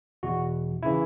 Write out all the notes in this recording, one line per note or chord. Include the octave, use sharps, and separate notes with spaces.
E2 B2 F#4
C#3 E3 E4